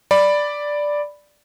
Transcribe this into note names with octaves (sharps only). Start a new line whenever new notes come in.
D5 B5